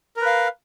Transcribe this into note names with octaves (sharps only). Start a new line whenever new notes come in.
A#4 B4 F5